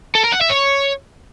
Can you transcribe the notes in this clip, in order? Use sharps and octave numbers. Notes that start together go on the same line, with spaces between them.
A4
A#4
F#5
E5
C#5